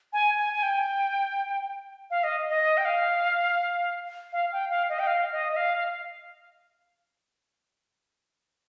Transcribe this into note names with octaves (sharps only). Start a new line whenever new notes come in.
G#5
G#5
G#5
G5
F5
D#5
D#5
G5
F5
F5
G5
F5
D#5
G5
F5
D#5
D#5
F5
F5